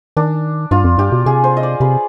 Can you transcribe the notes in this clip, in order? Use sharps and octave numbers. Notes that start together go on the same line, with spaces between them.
D#3 D4
G2 F4
F2
G2 G4
B2
C3 G#4
C5
D#5
D5
C3 B4